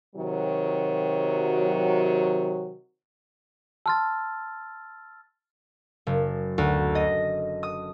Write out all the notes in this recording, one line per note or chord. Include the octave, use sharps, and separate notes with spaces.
C3 D#3 F#3
A5 C6 E6 F6 A6
F#1
D2
D#5
D#6